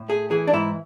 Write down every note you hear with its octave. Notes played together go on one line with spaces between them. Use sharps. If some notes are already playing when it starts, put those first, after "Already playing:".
Already playing: A2
A3 G#4
E3 G#4
D4
G#2 E4